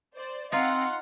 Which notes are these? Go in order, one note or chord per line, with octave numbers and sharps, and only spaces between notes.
C5 D5
C4 D#4 F4 F5 F#5 C6